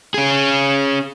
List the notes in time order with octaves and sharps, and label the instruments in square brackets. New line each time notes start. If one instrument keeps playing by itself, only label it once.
[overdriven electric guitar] C#4 G#4